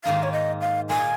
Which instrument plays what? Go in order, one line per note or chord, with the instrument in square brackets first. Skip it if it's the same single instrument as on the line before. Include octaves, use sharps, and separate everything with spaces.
[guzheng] G#2 D#3 A#3 D#4 [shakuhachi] F5
[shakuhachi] C#5
D#5
F5
[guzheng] A#2 A#3 F4 [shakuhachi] G#5